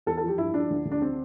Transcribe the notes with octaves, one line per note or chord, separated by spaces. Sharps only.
E2 A4
A4
F3
G4
G2 E4
F3 D4
D2
D2
D4
C4